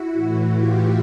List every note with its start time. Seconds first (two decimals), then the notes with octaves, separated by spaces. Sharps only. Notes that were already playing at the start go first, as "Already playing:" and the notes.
Already playing: E4 F#4
0.12 A2 E3
0.54 F4 G4